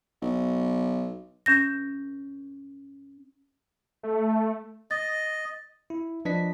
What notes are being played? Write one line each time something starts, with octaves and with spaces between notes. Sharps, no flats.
B1
C#4 G6 A#6
A3
D#5 A6
E4
F3 D4 B4 D#5 B6